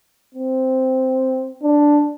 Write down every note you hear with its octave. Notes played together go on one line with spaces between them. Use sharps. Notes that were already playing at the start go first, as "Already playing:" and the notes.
C4
D4